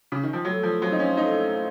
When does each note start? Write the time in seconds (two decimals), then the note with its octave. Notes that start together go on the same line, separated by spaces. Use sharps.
0.12 C#3
0.23 D#3
0.33 F3
0.45 A2 F#3
0.63 F3
0.81 F3 F#3 C4
0.92 D#4
0.99 C#4
1.17 A2 D#4
1.54 F3